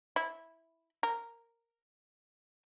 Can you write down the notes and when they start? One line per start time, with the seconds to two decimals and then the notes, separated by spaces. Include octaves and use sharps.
0.16 E4
1.03 A#4